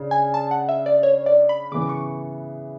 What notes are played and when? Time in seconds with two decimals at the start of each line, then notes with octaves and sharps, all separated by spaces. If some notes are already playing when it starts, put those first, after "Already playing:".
Already playing: C#3 D4
0.11 G#5
0.34 A5
0.51 F#5
0.69 E5
0.86 D5
1.03 C#5
1.26 D5
1.49 B5
1.71 C#3 E3 B3 D6
1.82 D6
1.89 C#6